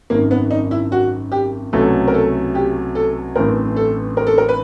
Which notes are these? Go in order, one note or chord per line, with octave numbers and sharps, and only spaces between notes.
G#1 F#2 D#3 A#3
B3
D#4
E4
F#4
G4
C2 B2 F#3 A3 C#4 A4
A#4
A4
G4
A4
A1 G2 E3 A3 C4 A#4
A4
A#4
A4
A#4
B4